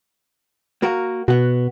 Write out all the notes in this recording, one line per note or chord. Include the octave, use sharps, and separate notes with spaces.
A#3 F#4 A#4
B2 B3 F#4